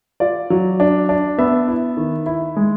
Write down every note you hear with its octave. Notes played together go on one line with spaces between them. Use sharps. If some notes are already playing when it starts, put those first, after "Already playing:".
F4 D5
F#3
D4
D4
B3 E5
E4
D#3
E4
G#3